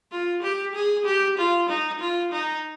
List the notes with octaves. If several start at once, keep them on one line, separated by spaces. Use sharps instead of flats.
F4
G4
G#4
G4
F4
D#4
F4
D#4